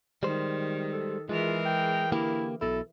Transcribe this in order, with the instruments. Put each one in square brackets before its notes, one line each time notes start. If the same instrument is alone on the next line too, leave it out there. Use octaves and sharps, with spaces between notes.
[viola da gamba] D#3 [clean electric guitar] G3 G#3 C5
[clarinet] A4
[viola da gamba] E3 G#4 A#4 [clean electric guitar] G#3 [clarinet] F4
[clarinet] G5
[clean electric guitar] D3 A#3 G4 [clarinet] E4
[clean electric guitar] B1 B2 E4 [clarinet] A4